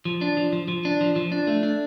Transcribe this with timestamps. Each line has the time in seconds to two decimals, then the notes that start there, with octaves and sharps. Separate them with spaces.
0.05 F3
0.21 D4
0.37 F3
0.53 F3
0.68 F3
0.85 D4
1.01 F3
1.16 F3
1.32 D4
1.47 A3
1.63 D4